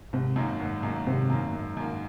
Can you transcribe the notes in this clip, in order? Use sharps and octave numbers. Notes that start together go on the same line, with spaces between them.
G#1 C3
F#2 D#3 A#3
G#1
F#2 D#3 A#3
G#1 C3
F#2 D#3 A#3
G#1
F#2 D#3 A#3